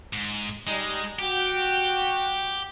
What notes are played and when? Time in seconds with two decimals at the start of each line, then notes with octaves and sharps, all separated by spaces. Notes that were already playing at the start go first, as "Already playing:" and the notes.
0.13 G#2
0.67 G3 G#3 D#4
1.19 F#4 G4 G5